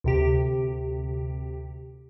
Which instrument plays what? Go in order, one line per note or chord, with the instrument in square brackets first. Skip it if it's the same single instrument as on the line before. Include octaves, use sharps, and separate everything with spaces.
[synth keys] D2 C3 G4